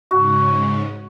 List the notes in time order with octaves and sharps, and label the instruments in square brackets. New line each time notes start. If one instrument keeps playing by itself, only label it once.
[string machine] G#2 C#3 [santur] F#4